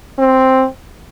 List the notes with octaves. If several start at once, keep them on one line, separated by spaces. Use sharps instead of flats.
C4